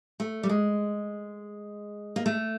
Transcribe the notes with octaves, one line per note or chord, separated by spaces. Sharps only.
A3
G3
G#3
A#3
A3